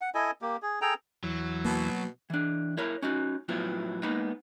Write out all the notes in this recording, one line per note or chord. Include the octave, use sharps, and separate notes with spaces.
F#5
E4 A4 D#5 G#5
A#3 G4
G#4
G#4 A4 G5 A#5
E2 E3 F#3
B2 A#3
E3 D4
E4 A#4 C#5 B5
C#4 D#4 F#4
A2 F3 F#3 B3 E4 F4
G#3 A#3 B3 D#4 B5